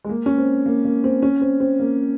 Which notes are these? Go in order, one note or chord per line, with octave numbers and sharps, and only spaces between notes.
G#3
A#3
C#4
C4
A#3
A#3
C4
C#4
C4
C4
A#3